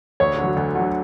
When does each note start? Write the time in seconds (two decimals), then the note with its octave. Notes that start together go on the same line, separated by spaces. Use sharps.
0.20 D2 C#5
0.38 D3 F#3
0.56 D2
0.75 D3 F#3